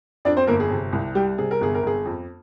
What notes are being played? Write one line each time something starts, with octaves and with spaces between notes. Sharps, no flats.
F2 D4 D5
C4 C5
G1 A#3 A#4
G#4
C3
C2
G3 G4
C3 G#4
A#4
G1 G#4
A#4
G1 G#4
F2